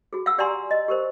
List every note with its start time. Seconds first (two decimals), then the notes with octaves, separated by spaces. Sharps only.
0.13 F#4 G#4
0.26 F5 F#5 E6
0.38 G4 D5 F#5 G#5 A#5 C6
0.71 D#5
0.88 G4 A#4 C5